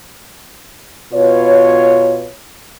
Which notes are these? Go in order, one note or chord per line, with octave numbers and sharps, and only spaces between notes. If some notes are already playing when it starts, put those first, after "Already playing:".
B2 F4 B4 C#5